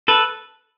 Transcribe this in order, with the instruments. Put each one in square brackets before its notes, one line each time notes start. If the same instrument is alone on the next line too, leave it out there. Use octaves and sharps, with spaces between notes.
[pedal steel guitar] A4 B4